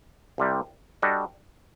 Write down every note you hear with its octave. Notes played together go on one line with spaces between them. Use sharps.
C2 C3 G3
G3 D4 F#4 A4 D#5